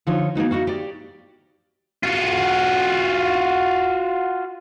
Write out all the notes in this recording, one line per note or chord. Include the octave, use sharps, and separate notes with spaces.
D3 F3 D#4 F4 C5 C#5
A#3 B3 D#4 F#4
D#4 E4 F#4 F5
G4 D5
F4 F#4